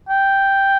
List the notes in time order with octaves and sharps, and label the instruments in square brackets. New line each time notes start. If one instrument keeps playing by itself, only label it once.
[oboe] G5